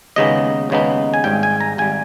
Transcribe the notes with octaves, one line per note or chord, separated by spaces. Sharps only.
D#2 C#3 G#3 B3 D#4 D#5
D#2 C#3 G#3 B3 D#4
G#5
G#1 G#2 G3 G5
G#5
A#5
G#1 G3 G#5